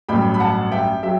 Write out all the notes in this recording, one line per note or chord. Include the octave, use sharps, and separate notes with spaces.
A1 G2 F#3 G5 B5
B5
F#5 A5
E5 G5
F#3 E5 G5